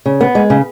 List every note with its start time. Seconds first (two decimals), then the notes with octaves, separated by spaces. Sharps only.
0.06 C#3
0.21 B3
0.35 G#3
0.50 C#3